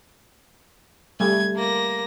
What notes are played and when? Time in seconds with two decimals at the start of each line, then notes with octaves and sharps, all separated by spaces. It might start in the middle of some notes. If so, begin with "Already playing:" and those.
1.20 G3 A3 G#6
1.56 A#3 A#6